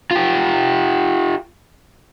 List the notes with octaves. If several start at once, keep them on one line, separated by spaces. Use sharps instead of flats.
F4 G4